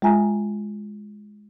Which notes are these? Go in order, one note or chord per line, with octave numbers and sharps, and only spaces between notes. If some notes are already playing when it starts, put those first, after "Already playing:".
G#3 F4 E5 G#5 A#5